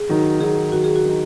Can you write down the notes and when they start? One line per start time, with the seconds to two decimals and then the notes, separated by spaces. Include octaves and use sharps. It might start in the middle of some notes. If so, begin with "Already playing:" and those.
Already playing: G#4
0.09 D#3 F#3 D#4
0.40 D#3 F#3 D#4 G#4
0.72 D#3 F#3 D#4 F#4
0.84 G#4
0.96 F#4
1.04 D#3 F#3 D#4